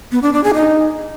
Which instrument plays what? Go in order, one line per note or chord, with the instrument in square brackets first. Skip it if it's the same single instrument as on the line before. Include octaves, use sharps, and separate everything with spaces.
[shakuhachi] B3
D4
D4
G#4
D#4